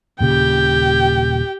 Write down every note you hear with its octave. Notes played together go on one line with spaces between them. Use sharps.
D#1 A#2 C#3 G4 G5